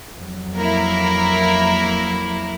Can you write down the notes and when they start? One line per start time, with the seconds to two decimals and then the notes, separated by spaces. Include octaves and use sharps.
0.19 F2 F#3
0.55 A#3 E4 A#4